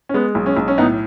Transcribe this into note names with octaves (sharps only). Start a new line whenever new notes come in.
C#4
G#3 B3
B1
C#4
B1
C#4
A2 B3 D#4